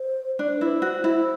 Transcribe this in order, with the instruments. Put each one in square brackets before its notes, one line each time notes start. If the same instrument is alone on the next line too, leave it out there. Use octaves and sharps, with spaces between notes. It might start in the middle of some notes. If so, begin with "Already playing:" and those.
Already playing: [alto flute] C5
[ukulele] D4 [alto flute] D5
[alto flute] C5
[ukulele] E4 [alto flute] B4
[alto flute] C5
[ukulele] F#4
E4